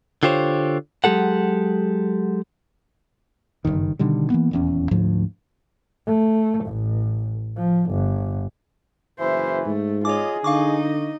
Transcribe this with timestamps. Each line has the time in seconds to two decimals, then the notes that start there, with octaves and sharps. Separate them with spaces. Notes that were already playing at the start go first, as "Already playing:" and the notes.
0.23 D3 F4 G4 C5 C#5
1.04 F#3 G#3 G4 A4 F#5
3.65 F#1 C2 G2 D#3
3.99 B2 D3 D#3 G3
4.30 E3 A#3 B3
4.51 D#1 E2 C#4
4.91 D2 G#2 F3
6.07 A3
6.65 A1
7.57 F3
7.91 G1
9.19 F#1 E3 C5 E5
9.65 G#2 A3
10.05 F4 G#4 C#5 D#5 D6
10.44 D3 D#4 D#5 F5 C#6 D6